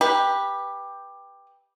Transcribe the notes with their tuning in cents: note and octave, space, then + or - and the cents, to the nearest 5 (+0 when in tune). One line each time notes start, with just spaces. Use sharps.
G4 +10 B4 -15